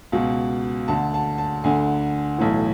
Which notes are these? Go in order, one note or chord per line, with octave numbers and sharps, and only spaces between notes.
C#2 B2
D2 D3 A5
A5
A5
D2 D3 G#5
B1 A2 E3